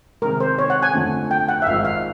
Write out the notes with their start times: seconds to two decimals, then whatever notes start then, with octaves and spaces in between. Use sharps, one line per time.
0.22 C3 D#3 G#3 A#4
0.40 C5
0.59 C#5
0.70 F#5
0.83 G#5
0.94 F2 D3 F3 A3
1.31 G5
1.49 F#5
1.62 E5
1.66 G#1 G#2 F3 G#3 F5
1.85 F5